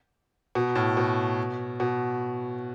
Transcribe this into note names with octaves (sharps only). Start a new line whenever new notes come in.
B2
A2
B2
B2